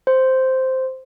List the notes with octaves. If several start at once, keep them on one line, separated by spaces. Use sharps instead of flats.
C5